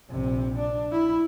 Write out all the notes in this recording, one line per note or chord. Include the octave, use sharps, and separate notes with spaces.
A#1 C3
D4
E4